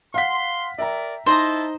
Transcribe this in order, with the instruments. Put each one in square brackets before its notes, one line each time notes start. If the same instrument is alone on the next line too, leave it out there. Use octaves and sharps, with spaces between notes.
[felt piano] F5 F#5 B6 [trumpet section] C6
[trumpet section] A#4 D5 [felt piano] E5 G5 A#5
[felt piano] D#4 [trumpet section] E4 A5 [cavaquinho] C5 D#5 A#5